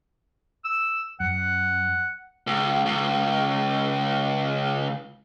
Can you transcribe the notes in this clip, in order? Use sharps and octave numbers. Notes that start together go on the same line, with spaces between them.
E6
F#2 F#5
C#2
C#2